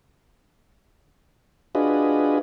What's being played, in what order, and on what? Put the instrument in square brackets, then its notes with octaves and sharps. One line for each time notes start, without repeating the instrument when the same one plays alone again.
[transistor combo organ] D4 F4 F#4 G#4 B4 D#5